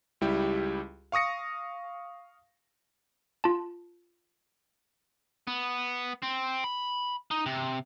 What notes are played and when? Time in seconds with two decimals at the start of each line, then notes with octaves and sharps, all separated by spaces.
0.21 C#2 G3 E4 G4
1.12 F5 C#6 D#6 A#6 C#7
3.44 F4 A5
5.47 B3
6.23 C4
6.64 B5
7.31 D#4
7.46 C3